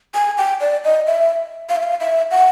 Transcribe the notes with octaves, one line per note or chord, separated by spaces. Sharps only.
G#5
G5
D5
D#5
E5
F5
E5
F5
E5
F#5